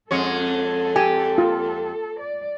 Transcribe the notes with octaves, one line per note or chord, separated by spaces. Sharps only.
F2 G#3 A4 C#5
G4 G#5
F4
D5